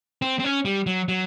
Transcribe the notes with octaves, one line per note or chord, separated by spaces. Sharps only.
C4
C4
C#4
G3
F#3
F#3